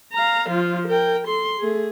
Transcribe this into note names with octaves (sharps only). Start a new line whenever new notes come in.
F5 A#5
F3 F4
A#4 G5
A4 C6
A3 G#4